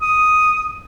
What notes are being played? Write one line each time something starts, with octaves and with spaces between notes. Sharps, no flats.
D#6